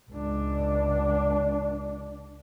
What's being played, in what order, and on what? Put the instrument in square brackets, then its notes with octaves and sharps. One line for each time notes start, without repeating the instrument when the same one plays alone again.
[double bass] C#2 D4